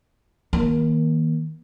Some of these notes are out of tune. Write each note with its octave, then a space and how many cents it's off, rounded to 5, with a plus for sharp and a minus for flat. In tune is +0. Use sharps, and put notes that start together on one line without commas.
D#3 +30 A#3 +20